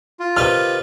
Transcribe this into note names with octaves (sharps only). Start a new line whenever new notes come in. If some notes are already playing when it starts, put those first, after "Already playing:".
F4
C3 D#3 B4 F6